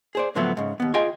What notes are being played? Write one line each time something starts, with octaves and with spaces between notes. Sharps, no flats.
G#4 C5 D5
A2 D3 F3 F#3 A3 B3
G#2 C#3
D#2 B3
F4 G#4 D#5 F5 G5 G#5